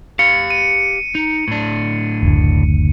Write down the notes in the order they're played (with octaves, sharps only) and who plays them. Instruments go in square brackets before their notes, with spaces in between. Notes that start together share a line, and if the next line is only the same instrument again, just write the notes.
[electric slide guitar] G4 F5 [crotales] C#7
[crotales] D#7
[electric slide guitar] D#4
A2 D4
[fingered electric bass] F#1 D2